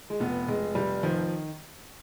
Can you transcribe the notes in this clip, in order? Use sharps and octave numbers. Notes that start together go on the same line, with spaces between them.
G#3
F1 B3
F1 G#3
F1 G3
D#3 F3